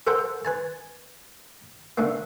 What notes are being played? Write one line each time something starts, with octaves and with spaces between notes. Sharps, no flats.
A4 A#4 C5 F#5 G5
B4 G#5 A5
D3 A3 A#3